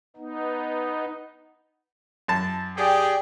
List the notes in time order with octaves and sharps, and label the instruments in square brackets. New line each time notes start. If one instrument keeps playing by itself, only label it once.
[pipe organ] B3 D#4
[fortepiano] F#2 A5
[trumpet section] G4 G#4 [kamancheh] D5 G5